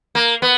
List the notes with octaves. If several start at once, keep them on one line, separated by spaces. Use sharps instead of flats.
A#3
B3